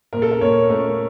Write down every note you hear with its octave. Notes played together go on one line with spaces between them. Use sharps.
A#2 A#4
A4
A#4
A#2 C#5
A3 A#4